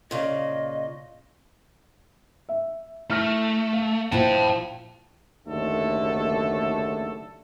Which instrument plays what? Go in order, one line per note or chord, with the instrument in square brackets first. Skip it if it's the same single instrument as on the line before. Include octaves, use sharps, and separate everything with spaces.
[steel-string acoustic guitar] A#2 C#3 [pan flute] D#5
[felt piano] E5
[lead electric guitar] A3 [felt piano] E4 F6 A#6
[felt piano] F5
[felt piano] A#1 [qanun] F3 E4 F#5 [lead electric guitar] G5 A5
[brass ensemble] F#1 D#2 D3 A3 A4